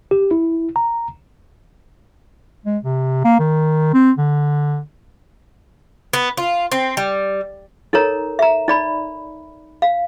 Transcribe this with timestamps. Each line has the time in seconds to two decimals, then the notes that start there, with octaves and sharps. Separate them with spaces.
0.11 G4
0.31 E4
0.76 A#5
2.65 G#3
2.84 C3
3.24 A#3
3.40 D#3
3.94 C4
4.18 D3
6.13 B3
6.37 F4
6.72 C4
6.97 G3
7.93 D#4 A4 A#4 C#5 A#5
8.39 E5 A#5
8.68 D#4 D5 B5
9.82 F5